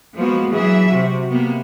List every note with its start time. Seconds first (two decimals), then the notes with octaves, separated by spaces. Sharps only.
0.16 F3 G#3 A#3 B3 F#4
0.51 E3 F#3 G#4 E5
0.90 C3 F#4
1.30 C3 A#3 B3